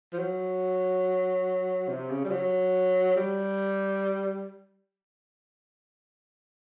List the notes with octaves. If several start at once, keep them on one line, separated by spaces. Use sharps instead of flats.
F3
F#3
C3
C#3
G3
F#3
G3